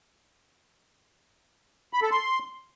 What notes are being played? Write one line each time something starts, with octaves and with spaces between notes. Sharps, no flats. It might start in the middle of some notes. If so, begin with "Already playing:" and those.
B5
A4
C6